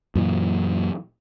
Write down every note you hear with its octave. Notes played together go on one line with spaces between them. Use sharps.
F#2 A#2 E3